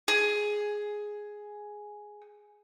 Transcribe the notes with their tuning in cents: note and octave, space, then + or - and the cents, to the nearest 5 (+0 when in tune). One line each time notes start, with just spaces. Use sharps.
G#4 +5